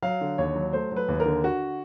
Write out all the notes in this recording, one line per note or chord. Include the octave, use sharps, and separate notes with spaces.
F#3 F5
D3
D#2 C#5
F#3
A3 C5
F#3 B4
D#2
A#4
D3
D3 F#4